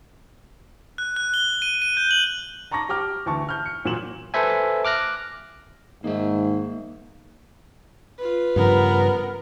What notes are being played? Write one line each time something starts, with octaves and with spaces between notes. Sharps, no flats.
F#6
F#6
G7
D#7
D#7
G6
F#7
A5 A#5 C#6 D6 A#6
G4 G5 D6 F6
D2 E3 A5 C#6
F6 G6
C#7
E2 A#2 F#3 C#5 E7 F#7
A4 B4 C5 E5 G#5
D6 F6 F#6 A#6
G#2 D#3 A#3 E5
F4 B4
G2 C#3 F3 B3 A#4